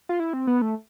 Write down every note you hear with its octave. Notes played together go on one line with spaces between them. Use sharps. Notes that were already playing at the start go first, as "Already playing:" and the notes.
F4
E4
C4
B3
A3